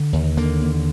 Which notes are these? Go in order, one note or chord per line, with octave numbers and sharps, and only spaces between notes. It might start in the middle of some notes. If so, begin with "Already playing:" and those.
Already playing: D3
D#2
D3 A#3
D#2